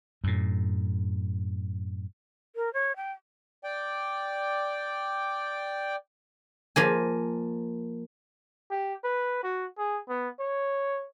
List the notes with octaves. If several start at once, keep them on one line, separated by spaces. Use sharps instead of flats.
F#2 A2
A#4
C#5
G5
D5 G5
F3 A#3 G#5
G4
B4
F#4
G#4
B3
C#5